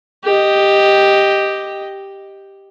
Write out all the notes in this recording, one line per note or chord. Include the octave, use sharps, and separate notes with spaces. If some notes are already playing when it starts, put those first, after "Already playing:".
G4 D#5